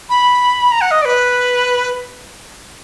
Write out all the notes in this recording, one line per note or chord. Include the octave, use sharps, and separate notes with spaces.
B5
A#5
F#5
D#5
D5
B4